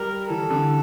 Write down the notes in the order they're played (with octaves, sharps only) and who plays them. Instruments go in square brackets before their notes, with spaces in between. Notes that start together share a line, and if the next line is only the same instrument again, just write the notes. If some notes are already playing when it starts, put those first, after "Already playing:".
Already playing: [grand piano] G3 [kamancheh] A#4
[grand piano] E3 [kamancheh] A4
[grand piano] D3